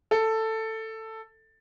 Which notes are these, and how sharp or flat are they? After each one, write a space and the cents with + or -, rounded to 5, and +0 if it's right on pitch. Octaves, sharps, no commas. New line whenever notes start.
A4 +10